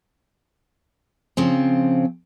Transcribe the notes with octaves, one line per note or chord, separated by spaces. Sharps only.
C#3 F3 C4